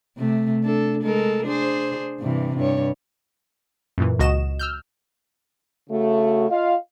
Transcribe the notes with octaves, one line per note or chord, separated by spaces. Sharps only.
C3 A3
D4 A4
G#3 A4 A#4
D4 G#4 C5
G2 C3 E3
G2 C#5
F#2 A#2 E3
C#2 F#4 D#5 E7
E6 F6 G6
C#3 A3 F#4
F4 D#5 F5